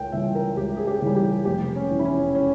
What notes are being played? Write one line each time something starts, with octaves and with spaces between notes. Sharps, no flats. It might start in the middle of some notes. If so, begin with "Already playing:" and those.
Already playing: C#2 A#4 G5
C#3 E3 G3 E5
A#4
C#2 G4
G#4
G4
C#3 E3 G3
G4
F1 G4
C#4
E2 E3
E4
C#4
C#4